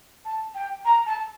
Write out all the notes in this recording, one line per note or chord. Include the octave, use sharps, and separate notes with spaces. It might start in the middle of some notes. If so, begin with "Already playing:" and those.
A5
G5
A#5
A5